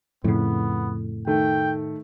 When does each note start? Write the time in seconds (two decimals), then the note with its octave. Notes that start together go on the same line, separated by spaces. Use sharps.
0.24 F2 A2 C#3 B3
1.27 D#3 A3 G5